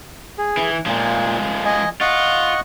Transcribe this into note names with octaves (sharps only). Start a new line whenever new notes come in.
G#4
E3
A#2 F3 G#3
D#5 G#5
F4 D#5 F#5 C#6